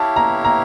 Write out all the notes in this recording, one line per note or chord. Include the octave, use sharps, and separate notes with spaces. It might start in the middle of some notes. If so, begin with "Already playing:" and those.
Already playing: E4 G4 C#5 F5 A5
A#5
A#5